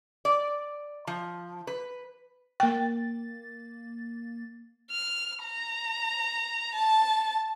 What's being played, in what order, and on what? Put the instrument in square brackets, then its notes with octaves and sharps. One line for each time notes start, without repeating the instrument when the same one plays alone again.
[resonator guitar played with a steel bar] D5
F3
B4
[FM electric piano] A#3 A6 [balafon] G5
[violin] F6
A#5
A5